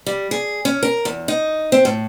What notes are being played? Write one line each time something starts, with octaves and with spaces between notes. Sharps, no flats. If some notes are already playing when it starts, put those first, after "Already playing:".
G3
G#4
C#4
A#4
E2
D#4
C4
A2